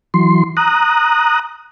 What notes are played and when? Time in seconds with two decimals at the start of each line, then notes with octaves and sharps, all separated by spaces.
0.14 E3 F#3 C6
0.57 A#5 D#6 F#6